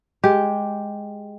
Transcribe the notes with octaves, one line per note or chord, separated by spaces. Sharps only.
G#3 G4